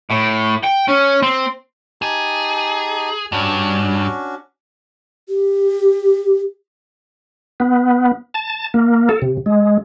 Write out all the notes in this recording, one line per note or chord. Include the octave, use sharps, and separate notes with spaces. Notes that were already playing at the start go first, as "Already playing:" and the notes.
A2
G5
C#4
C4
D#4 G4 G#4 A5
G2 C#4 D4 F#4
G4
B3
A5
A#3
A4
C3
G#3